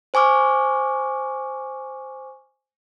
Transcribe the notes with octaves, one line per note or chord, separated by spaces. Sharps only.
C5 G#5 C#6 D6 F6